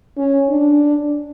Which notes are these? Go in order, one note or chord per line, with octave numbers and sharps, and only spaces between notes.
C#4
D4